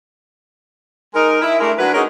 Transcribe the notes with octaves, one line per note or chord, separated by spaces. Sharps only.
G#3 D#4 A#4
E4
G#3 A3 D4 E4 A#4
F#3 D4 F#4 B4
C#4 D#4 F#4 G#4 A#4